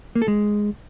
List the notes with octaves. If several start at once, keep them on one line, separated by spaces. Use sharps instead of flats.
A#3
A4
G#3